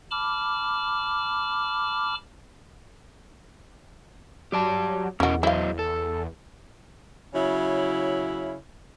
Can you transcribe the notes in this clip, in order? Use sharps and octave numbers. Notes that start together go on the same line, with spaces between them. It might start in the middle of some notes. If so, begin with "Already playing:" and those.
A5 B5 D6 F6
F#3 G4 D5 A5
E2 F#3 C#4 F#4 A#4 D#5
F#3 E4 C5 D#5 F5
A4
C#3 F#3 E4